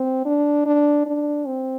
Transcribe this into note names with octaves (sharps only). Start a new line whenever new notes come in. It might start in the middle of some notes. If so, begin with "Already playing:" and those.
Already playing: C4
D4
D4
D4
C4